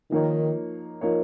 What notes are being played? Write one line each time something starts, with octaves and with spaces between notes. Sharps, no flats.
D#3 F3 A#3 D#4 A#4 C#5
F3 A#3 D#4 A#4 C#5